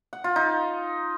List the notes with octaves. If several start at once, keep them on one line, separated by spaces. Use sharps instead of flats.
F#5
F4
D#4